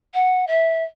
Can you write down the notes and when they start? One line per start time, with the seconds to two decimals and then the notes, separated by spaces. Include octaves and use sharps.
0.14 F#5
0.47 E5